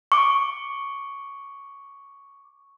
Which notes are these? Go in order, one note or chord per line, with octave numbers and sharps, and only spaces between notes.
C#6 D6